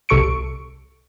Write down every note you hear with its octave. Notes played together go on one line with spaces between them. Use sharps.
C2 C3 A4 C#6 C#7 D7